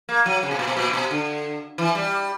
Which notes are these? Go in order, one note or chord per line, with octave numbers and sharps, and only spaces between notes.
A#3
F#3
C#3
B2
A#2
B2
A#2
B2
D3
E3
G3